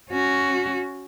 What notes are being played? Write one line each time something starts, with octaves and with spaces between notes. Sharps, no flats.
C#4 F#4